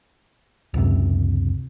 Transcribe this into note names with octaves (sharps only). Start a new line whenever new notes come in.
C#2 F#2 C3